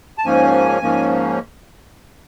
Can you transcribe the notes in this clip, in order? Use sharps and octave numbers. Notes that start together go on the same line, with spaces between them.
A5
G#2 F3 A#3 C#4 G#5
G#2 F3 A#3 C#4